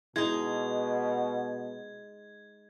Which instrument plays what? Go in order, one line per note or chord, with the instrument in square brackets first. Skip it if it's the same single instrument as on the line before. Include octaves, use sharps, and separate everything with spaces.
[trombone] B2 [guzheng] G#3 D#4 [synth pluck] E4 [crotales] G#6